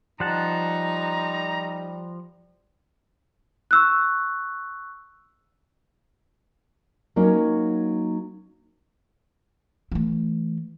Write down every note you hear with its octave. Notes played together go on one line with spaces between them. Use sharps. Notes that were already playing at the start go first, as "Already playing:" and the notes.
F3 G3 D#4 F#5 A5 A#5
C#6 E6 F#6
F#3 A#3 C#4 D#4
E3 A3